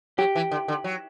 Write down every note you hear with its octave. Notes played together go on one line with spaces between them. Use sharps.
F#3 G4
E3
D3
D3
F#3